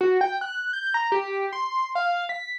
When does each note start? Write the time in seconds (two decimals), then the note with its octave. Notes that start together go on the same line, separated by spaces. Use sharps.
0.01 F#4
0.21 G5
0.41 F#6
0.73 G6
0.94 A#5
1.12 G4
1.53 C6
1.95 F5
2.29 B6